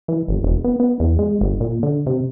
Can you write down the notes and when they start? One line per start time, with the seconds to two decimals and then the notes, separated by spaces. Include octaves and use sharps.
0.08 E3
0.28 G1
0.43 E1
0.64 B3
0.80 B3
1.00 E2
1.19 G#3
1.41 G1
1.60 A#2
1.83 D3
2.07 C3